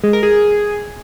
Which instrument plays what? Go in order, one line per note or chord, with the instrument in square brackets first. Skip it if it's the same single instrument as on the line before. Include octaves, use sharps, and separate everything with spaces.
[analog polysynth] G#3
A#4
G#4